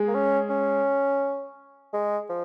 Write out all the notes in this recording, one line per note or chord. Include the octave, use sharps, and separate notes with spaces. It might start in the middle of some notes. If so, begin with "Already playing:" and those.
Already playing: G#3 G#4
A#3
C#4
C#4
G#3
F3